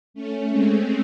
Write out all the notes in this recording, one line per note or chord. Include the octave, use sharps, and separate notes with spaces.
A3 C#4
G#3 C4